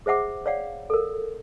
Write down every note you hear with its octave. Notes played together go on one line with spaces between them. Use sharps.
G#4 C5 E5 F#5 D6
C#5 D5 F5 F#5
A4 A#4